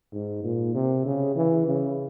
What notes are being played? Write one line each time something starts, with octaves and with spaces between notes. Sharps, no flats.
G#2
A#2
C3
C#3
E3
C#3